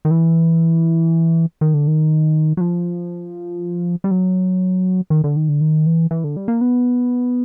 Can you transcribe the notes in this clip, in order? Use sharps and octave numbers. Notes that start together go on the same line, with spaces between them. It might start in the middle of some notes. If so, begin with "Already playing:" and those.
D#3
E3
D#3
D3
D#3
F#3
F3
G3
F#3
D#3
D3
D#3
D3
D#3
E3
E3
D3
G3
A#3
B3